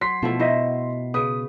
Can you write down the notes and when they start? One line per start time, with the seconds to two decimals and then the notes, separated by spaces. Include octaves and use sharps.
0.01 F#3 C6 B6 C7
0.22 B2 F3 A3 E4
0.39 E4 F#4 C5 D#5 E5
1.14 C#3 B4 D#6